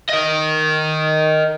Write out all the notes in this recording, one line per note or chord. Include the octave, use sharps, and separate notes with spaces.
A#4 D#5